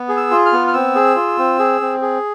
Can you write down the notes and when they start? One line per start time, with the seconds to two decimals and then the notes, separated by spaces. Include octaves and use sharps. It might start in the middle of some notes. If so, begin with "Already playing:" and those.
Already playing: B3
0.09 G#4
0.17 E6
0.31 F4
0.46 F6
0.53 B3
0.67 F6
0.73 C4 E6
0.95 G#4
1.16 F4
1.38 C4
1.59 G#4
1.81 C4
2.02 G#4